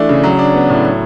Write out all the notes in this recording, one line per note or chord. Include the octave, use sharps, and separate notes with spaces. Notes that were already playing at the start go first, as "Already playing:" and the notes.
Already playing: E3 A3 D4
C#3
F#3
D4
B3
A2
F#3